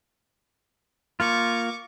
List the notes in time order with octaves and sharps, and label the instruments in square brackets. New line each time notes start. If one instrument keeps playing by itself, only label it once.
[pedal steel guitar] A#3 F4 [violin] C#6 D6